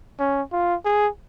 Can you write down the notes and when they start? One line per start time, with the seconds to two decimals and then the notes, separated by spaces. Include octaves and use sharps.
0.19 C#4
0.52 F4
0.85 G#4